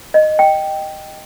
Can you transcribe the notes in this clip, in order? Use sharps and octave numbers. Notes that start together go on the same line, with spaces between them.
D#5
G5